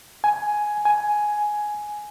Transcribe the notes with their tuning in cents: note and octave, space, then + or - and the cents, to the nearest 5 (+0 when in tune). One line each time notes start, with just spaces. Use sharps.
G#5 +10
G#5 +10